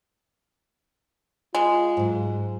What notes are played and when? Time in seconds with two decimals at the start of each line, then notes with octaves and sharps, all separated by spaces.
1.55 G#3 F4
1.97 G#2 F#3